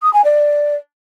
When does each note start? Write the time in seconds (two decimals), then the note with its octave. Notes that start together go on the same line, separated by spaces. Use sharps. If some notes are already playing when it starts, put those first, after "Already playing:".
0.02 D#6
0.13 G#5
0.24 D5